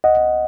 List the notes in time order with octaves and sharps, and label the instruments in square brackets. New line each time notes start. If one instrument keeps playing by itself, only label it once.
[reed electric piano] C#2 D#5 F#5